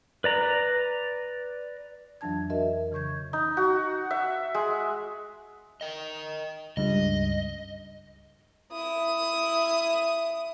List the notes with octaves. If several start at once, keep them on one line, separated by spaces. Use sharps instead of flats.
B4 D5 A#5
F2 E3 F#3 D4 A5 G#6
F#4 A#4 D#5 E5
C#3 E3 C#6 G6 G#6
D#4
F#4
E5
G#3
A#4 D#5
C#2 G2 D#5
E4 D#6